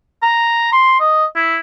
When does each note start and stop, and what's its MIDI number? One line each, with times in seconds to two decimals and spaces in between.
0.23 0.68 82
0.73 0.96 84
1.00 1.25 75
1.36 1.58 64